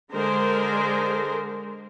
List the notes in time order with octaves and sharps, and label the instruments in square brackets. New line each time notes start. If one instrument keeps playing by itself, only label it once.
[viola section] D3 G#3 A#4 C5